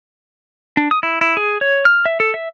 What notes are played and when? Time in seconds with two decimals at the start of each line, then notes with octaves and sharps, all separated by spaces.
0.77 D4
0.91 D#6
1.03 E4
1.21 E4
1.37 G#4
1.61 C#5
1.85 F6
2.06 E5
2.20 A4
2.34 E5